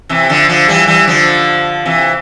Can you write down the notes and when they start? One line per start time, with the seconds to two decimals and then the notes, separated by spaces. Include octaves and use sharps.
0.09 C3 E3
0.29 D3 F3
0.49 D3 F3
0.68 E3 G3
0.87 E3 G3
1.08 D3 F3
1.86 C3 E3